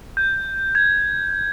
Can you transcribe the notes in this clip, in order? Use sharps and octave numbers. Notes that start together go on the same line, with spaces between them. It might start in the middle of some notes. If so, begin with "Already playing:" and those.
G6
G#6